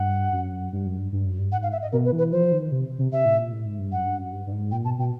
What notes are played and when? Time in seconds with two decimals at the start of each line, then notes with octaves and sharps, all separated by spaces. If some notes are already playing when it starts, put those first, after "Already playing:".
Already playing: G2 F#5
0.32 F#2
0.72 G2
0.86 F#2
0.99 G2
1.12 G2
1.26 F#2
1.39 G2
1.52 G#2 F#5
1.63 F5
1.72 E5
1.82 D#5
1.92 B2 A#4
2.05 B4
2.12 E3
2.18 B4
2.32 F3 C5
2.52 D#3
2.72 C3
2.99 C3
3.12 C3 E5
3.25 A2
3.39 A#2
3.52 A2
3.65 G#2
3.79 G2
3.92 F#2 F#5
4.06 G2
4.18 F#2
4.32 G2
4.46 G2
4.52 G#2
4.71 A#2 G5
4.85 B2 A5
4.99 B2 G5